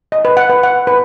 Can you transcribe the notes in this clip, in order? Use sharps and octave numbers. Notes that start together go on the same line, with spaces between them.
D#5
B4
F#5
B4
F#5
B4